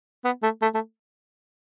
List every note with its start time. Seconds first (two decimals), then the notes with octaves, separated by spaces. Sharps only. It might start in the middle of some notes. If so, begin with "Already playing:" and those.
0.24 B3
0.43 A3
0.62 A3
0.74 A3